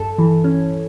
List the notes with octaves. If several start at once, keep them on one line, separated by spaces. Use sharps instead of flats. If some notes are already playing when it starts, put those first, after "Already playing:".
Already playing: G2 A4
E3
C#4